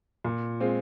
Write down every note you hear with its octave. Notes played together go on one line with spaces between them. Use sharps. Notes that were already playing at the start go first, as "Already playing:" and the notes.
A#2
G#3 C4 F4